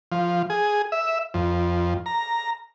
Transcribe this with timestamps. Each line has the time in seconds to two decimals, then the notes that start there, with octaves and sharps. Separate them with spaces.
0.12 F3
0.50 G#4
0.92 E5
1.34 F2
2.06 A#5